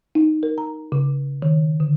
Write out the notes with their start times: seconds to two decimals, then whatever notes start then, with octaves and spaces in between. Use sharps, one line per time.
0.15 D#4
0.43 A#4
0.58 A#5
0.92 C#3
1.42 D#3
1.80 D3